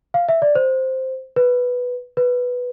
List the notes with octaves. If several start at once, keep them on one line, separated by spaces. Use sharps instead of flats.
F5
E5
D5
C5
B4
B4